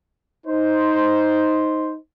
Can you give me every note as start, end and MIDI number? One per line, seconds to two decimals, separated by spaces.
0.46 1.96 63
0.46 1.96 72